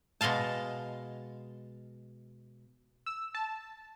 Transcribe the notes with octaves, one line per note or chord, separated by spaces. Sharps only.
B2 G#3 D#5 F5 A5
E6
A5